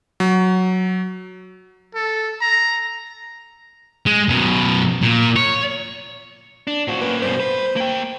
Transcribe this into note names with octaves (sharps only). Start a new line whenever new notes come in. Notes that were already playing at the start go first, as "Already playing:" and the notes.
F#3
A4
A#5
G#3
F#2 B2
A#2
C#5
D4
A2 F3 F#4
A#3 C#4 B4
G2 B2 C5
B4
A#3 G5